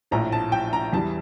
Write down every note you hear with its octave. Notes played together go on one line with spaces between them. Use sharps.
A#1 A2 F3 A#5
A5
G5
A#5
E2 E3 G3 A5